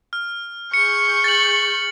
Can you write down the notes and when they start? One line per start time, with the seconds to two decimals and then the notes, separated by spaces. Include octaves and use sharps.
0.13 F6
0.74 G#4 C#6 G6 C#7
1.24 A6 F#7